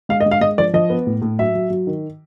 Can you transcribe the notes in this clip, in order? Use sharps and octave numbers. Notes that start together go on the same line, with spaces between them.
G#3 F5
D#5
G#3
F5
G#3 D#5
F3 D5
F3 D#5
B3
A2
A2
F#3 E5
F#3
F#3
D#3